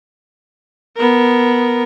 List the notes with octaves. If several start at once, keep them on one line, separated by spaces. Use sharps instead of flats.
B3 A#4